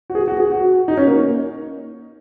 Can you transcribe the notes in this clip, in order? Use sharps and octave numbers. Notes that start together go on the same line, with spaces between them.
F#4
G#4
F#4
G#4
F#4
D#4
C#4
A#3